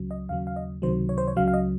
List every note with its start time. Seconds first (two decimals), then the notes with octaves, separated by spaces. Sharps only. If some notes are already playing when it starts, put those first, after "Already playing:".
Already playing: C#2 C#3 F#3
0.11 D#5
0.29 D#2 C#3 F#3 F5
0.47 F5
0.56 D#5
0.82 C#2 C3 D#3 F#3 C5
1.09 C#5
1.18 C5
1.28 C#5
1.36 C#2 C#3 F#3 F5
1.48 F5
1.54 D#5